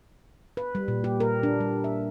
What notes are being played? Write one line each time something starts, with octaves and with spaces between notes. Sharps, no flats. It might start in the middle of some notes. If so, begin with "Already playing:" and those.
B4
G3
A#2
G4
A#4
D4
G3
E5